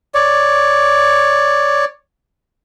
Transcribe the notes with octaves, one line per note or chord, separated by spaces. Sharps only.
C#5 D5